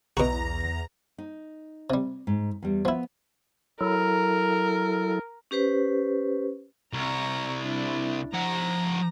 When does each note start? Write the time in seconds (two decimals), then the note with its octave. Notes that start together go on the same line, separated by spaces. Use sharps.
0.17 B1 E2 B2 F#4 A#5
1.18 D#4
1.90 C3 G3
2.27 G#2
2.63 E2 G3
2.85 F3 B3 E4
3.81 F#3 E4 A4 A#4
5.51 C#4 G4 B4 C5
6.93 C2 A#5 C#6
7.63 D4 E4
8.33 F3 F#5 A#5